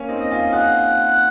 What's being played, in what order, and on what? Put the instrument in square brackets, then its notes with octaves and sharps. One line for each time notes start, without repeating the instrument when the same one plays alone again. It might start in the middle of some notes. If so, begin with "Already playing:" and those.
Already playing: [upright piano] A#3 C#4
C4 D#4
[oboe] D#5
[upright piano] C#4 F4
[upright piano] F4 G#4 [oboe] F#5